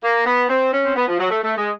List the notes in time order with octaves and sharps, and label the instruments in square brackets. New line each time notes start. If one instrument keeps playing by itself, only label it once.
[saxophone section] A#3
B3
C4
C#4
C4
B3
F3
F#3
A3
A3
G#3